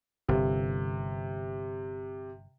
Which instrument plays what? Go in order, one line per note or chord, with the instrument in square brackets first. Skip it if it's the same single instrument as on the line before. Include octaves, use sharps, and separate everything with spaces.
[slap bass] G1 [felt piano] C3